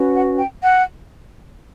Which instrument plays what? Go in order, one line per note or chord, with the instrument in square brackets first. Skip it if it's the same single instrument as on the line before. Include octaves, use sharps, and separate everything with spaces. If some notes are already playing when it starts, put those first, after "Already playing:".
Already playing: [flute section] C#4 F#4 B4
F#5
G5
F#5